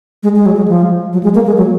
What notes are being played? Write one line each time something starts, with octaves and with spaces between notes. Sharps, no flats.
G#3
G#3
F#3
G#3
F3
F#3
G#3
A#3
G#3
F#3